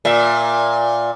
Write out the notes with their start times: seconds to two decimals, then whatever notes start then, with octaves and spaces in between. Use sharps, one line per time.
0.05 A#2 E5